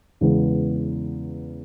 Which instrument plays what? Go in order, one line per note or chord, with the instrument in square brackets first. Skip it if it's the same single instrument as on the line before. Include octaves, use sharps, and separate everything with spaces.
[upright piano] E2 C#3 E3 G#3 B3